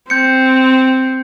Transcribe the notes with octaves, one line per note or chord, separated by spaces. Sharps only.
C4 G6 C#7